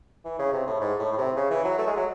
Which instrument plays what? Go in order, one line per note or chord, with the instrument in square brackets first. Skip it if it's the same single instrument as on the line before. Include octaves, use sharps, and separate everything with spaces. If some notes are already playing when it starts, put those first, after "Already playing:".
[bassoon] E3
C#3
C3
A2
G#2
A2
A2
C3
C#3
E3
F#3
A3
G#3
F#3